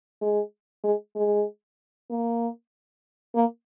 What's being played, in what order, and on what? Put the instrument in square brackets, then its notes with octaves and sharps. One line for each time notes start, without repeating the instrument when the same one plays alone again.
[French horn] G#3
G#3
G#3
A#3
A#3